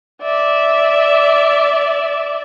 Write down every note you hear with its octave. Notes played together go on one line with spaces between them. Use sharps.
D5 E5